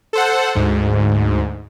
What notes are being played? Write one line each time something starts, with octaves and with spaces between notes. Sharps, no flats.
A4 C5 F#5
D2 G#2